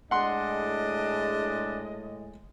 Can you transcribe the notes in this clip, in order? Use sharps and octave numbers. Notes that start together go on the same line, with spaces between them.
A2 G#3 D4 D#5 F#5 C6